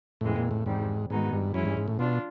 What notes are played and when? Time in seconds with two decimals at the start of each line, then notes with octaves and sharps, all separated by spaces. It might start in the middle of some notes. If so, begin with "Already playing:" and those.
0.21 F2 A2 C#3 E3 G#3 C4
0.36 A#2
0.51 A2
0.66 E2 G#2 C3 D#3 G3
1.10 G#2 D#3 G#3 B3 D#4 F#4
1.33 G2
1.54 F#2 E3 G#3 C#4 E4
1.65 G2
1.77 G#2
1.88 A2
1.99 B2 D4 F4